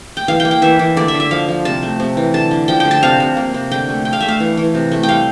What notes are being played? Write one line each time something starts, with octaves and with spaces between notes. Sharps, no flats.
G5
E3 F5
G5
A#3
G5
E3 E5
E3
D3 D5
E5
D3
E5
F3 F5
F3
C3 A5
A3
C3
E3
D3 A5
D3
F3 G5
G5
D3
A5
C3 F5
C3
A#3
C3
D3 G5
A3
D3 G5
F5
A3 E5
F5
E3
E3
C3
A3
G5
G3 F5